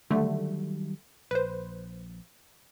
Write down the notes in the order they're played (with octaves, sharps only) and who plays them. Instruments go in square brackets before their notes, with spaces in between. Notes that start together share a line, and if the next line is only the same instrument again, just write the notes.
[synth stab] D3 A3 [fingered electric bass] D#3 F#3 G3
[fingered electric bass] A#1 [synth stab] B4 C5